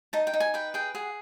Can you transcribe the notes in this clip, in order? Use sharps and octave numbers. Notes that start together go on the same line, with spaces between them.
D#4 A5
G5
D#4
G#5
B4 G5
G#4 G5
G#4 F#5